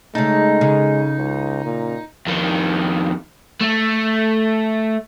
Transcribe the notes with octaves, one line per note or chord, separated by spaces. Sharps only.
C#3 G#3 A3 D#4
C#3
C#2
A#2
F2 D#3
A3